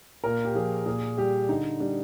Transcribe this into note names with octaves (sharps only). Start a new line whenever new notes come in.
A#2 A#4
G4
F3 G#4
A#2 G#4
G3 G4
D3 D#4
G3 D4